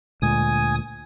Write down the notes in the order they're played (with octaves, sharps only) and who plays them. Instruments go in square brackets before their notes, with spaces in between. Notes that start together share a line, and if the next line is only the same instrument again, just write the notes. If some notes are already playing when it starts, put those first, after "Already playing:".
[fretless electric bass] D2 A#2 G#3 [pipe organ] G#5 D#6